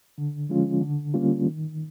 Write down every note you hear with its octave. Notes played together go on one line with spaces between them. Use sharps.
D3
F3 G#3 C#4 F4
D3
G3 A#3 C#4 F4
D#3